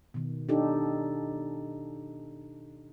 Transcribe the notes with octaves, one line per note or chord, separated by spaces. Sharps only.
B2 D#3
D4 D#4 G4 A4